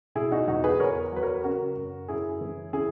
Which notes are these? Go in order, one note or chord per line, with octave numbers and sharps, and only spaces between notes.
B2 E4 G#4
D#4 F#4
E2 D#4 F#4
G#4 B4
E2 A#4 C#5
F#3 B4
A#4 C#5
C#3 F#4 A#4
F#2
F#2 E4 G#4
E3
C#3 E4 G#4